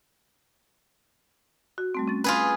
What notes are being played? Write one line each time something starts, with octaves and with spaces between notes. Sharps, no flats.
F#4
G3 A3 C4
C#4 A6
F4 G#4 B4